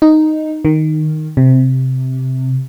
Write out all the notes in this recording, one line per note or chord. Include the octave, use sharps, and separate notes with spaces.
D#4
D#3
C3